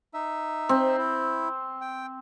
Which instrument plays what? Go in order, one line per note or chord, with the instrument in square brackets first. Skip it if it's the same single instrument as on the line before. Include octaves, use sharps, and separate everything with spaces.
[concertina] D#4 E5
[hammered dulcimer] C4
[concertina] E4
G5